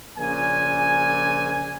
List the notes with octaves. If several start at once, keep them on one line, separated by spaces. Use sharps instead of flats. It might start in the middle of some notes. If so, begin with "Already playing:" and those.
A#1 A#2 C#3 G#5